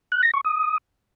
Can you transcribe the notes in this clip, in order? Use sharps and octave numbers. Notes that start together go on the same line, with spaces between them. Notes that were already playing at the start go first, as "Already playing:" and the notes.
F#6
A#6
C#6
D#6